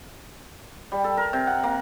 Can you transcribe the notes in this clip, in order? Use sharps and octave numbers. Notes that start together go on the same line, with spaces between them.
G3
A4
A#4
C3
F#5
A#3